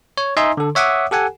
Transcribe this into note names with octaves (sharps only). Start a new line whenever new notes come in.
C#5
D#4 D#5 E5 G#5 A#5 C6
D3 A4
C#5 E5 F#5 D6 D#6
G4 A4 F#5 G#5